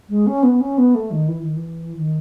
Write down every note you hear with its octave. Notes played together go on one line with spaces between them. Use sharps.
G#3
C#4
B3
C#4
B3
A3
D#3
E3
D#3
E3
D#3